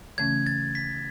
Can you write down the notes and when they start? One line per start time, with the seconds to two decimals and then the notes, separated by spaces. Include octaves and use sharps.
0.18 C#3 E3 A3 C#4 G#6
0.46 A6
0.75 B6